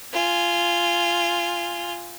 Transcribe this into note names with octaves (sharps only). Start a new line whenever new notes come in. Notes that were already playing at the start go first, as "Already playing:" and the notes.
F4 G#5